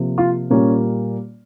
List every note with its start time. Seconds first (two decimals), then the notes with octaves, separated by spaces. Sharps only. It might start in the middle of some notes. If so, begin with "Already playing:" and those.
Already playing: C3 F3 A#3
0.18 F4
0.50 A#2 G3 A#3 C#4